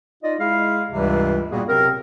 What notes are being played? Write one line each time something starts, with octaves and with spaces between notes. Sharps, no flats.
D#4 F4 D5 D#5
G#3 E4 G#4 F5
C#2 G2 C3 E3 G3
A#2 G3 A#3 B3 F#4 G#4
C3 F#3 C4 A#4